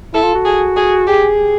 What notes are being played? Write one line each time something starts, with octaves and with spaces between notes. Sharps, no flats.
E4 A4
F4
F#4
G#4
G#4
G4 G#4